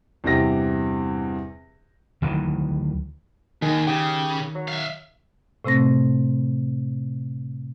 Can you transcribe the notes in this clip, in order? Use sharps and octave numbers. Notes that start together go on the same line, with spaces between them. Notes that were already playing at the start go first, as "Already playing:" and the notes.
E2 G2 C3 G4 A#6
D2 D#3 E3 F#3
D#2 D#3 G#4
C#3 G4
F#3
E5 F5
A2 C3 A3 C4 A#6